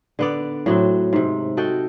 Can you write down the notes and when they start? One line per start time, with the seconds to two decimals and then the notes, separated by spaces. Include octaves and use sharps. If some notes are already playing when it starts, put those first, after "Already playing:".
0.19 D3 B3 D5
0.66 A2 F#3 C4
1.13 G#2 C3
1.57 F#4 A4 D#5 G5